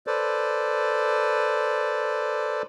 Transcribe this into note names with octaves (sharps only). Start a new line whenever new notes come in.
A4 B4 C5 D5